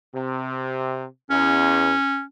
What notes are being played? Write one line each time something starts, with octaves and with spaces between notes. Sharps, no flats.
C3
E2 C#4